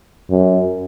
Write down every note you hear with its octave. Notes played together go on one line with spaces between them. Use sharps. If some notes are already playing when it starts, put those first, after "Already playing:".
F#2